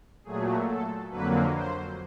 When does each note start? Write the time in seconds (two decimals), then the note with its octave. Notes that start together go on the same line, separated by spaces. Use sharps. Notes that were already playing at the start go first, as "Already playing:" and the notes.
0.24 A#2 F#3 A3 G#4
0.67 A4
1.10 F2 D3 F#3 A#3 B4
1.54 C5